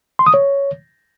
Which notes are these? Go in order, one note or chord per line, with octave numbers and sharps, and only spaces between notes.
C6
D#6
C#5